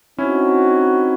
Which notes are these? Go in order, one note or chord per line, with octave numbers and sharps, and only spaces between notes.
C4 C#4 D#4 E4 F#4